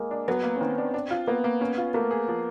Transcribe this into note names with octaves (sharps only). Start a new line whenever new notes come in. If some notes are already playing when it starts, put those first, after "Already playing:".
Already playing: G#3 A#3
D4
F#3 B3
A#3
C#4
D#3 C4
D4
D4
F4
A#3 B3
A#3
C#4
F4
A3 A#3
G#4
F3